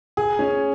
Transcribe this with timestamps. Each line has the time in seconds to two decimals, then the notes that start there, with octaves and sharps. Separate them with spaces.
0.17 G#4
0.39 C#4